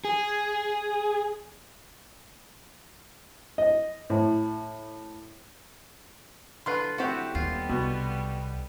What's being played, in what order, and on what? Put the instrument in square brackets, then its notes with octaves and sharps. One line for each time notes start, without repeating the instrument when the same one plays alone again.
[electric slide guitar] G#4
[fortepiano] D#5
A2
[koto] D3 F4 [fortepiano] B4 C6
[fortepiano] C4 F#5 [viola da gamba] E4 [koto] F#4 G4
[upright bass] D#2 [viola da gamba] G3 B3 [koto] F4
[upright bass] C2 [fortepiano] B2